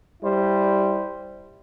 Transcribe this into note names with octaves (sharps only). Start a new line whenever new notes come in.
G3 E4 C5